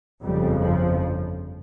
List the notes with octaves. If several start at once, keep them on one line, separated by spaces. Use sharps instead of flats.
G1 F2 C#3 G3
F3